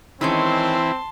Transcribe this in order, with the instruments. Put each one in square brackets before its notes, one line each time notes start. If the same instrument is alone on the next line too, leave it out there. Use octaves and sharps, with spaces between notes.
[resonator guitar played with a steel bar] D#3 G#3 C#4 [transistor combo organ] E3 E4 [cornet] C4 [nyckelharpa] A5 C6